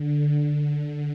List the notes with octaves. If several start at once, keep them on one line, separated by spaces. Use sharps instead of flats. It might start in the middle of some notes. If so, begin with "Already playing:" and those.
Already playing: D3
D3